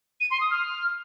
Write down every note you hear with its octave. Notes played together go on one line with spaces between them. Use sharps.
D#7
C6
D#6
F6